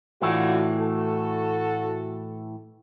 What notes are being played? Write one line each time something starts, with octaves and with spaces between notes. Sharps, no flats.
A2 D3 E3 A3 F4 F#4
F#4 A4